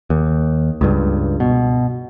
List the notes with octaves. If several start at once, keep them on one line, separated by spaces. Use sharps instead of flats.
D#2
C#2 G2
B2